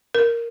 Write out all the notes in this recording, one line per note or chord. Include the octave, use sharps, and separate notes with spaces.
A#4